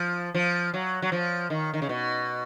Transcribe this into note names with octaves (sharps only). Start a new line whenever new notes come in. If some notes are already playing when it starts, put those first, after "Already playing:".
Already playing: F3
F3
F#3
F#3
F3
D#3
D#3
C#3
B2